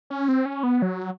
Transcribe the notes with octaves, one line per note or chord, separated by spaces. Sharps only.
C#4
C4
C#4
B3
F#3